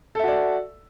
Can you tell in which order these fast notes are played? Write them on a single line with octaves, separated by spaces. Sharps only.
A4 E5 F#4 D5